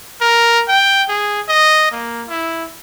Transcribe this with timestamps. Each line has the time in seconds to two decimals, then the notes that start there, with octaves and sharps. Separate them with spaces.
0.21 A#4
0.68 G5
1.09 G#4
1.48 D#5
1.92 A#3
2.29 E4